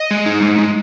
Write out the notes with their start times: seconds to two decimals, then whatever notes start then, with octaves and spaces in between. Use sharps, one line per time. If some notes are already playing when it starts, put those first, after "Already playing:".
Already playing: D#5
0.11 G#3
0.26 D#4
0.42 G#3
0.58 G#3